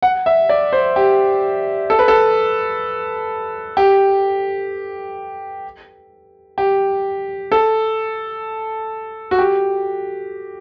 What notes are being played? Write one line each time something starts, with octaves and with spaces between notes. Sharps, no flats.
F#5
E5
D5
C5
G4
A4
B4
A4
G4
G4
A4
F#4
G4